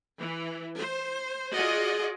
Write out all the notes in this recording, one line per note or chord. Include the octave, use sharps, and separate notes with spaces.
E3
C5
F4 F#4 G#4 D5 D#5 F#5